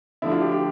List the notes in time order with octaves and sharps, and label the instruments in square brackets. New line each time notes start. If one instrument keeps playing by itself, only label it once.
[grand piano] D3 F3 A3 D4 [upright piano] E4
[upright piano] F4
G4
G4